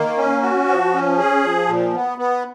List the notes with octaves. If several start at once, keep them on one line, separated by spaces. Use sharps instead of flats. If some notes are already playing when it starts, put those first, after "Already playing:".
Already playing: D#3 A#3
C#4
F#4
F3
C#4
G#4
F3
A#2
B3
B3